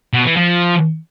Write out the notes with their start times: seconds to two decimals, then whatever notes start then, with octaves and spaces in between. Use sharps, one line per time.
0.13 B2
0.25 E3
0.36 F3